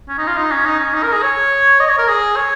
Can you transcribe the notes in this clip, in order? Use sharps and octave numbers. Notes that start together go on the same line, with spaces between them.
C#4
D#4
F4
D#4
C#4
D#4
C#4
D#4
A#4
G#4
C#5
D#5
C#5
A#4
G#4
C#5